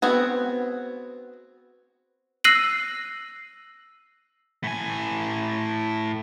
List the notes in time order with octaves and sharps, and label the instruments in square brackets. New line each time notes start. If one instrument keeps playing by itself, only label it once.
[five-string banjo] B3 C4 F#4 G#4
[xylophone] E6 F#6 A#6 C7 D#7 F#7
[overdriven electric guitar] A2 G#5